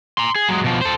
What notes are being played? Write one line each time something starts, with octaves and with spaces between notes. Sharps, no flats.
A#5 C6
G#4
F#3 G#3
B2 F3
A4 C5